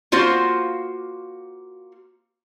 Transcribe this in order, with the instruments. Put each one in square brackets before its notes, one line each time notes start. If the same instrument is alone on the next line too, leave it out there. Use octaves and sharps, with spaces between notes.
[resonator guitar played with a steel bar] A#3 F4 F#4 C5